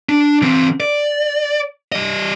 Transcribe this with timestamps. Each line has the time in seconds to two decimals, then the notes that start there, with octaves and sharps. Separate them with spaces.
0.09 D4
0.42 E3 C4
0.80 D5
1.92 G3 D#5